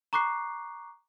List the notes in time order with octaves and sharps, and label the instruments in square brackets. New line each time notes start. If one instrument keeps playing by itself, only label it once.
[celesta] A#5 C#6 D6 F#6 C7